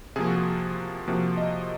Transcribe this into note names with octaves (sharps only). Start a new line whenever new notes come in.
C3 F3 A#3 G#4
F#4
G#4
C3 F3 A#3 F#4
D#5